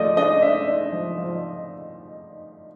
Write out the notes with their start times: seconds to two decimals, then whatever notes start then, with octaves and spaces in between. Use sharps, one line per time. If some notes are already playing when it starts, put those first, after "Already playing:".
Already playing: F3 A3 D5 D#5
0.17 D4 D#5
0.42 D4 E5
0.67 D4
0.92 F3
1.18 F3